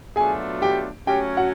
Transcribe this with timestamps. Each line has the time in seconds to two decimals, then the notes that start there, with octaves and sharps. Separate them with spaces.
0.16 B2 F#3 A3 D4 F4 G#4 G#5
0.62 G4 G5
1.07 F#3 A3 C#4 G4 G5
1.37 F#4 F#5